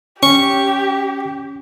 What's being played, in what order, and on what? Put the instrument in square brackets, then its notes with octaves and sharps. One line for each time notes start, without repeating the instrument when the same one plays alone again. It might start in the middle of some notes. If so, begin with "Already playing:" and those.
[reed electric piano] C#4 [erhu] G4 [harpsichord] C#6